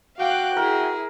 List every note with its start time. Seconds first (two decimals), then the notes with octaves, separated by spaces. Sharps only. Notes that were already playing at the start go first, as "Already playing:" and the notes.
0.19 F#4 F5 G5 D6 F#6
0.57 E4 G#4 A#4